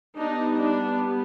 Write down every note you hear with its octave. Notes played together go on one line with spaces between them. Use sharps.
G3 B3 D4 D#4
D4